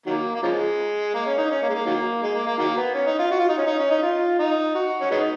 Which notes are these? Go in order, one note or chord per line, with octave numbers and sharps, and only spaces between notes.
D#3 F#3 A#3
A#3
C#3 F3 G#3
A#3
C#4
D#4
C#4
A#3
G#3
A#3
D#3 F#3 A#3
G#3
A#3
A#3
D#3 F#3 A#3
B3
C#4
D#4
F4
F#4
F4
D#4
C#4
D#4
C#4
D#4
F4
D#4
F#4
C#4
G#3 B3 D#4